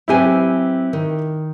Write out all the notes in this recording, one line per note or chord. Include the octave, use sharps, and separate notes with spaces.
F#3 C4 E4 G4 B4 G#5
D#3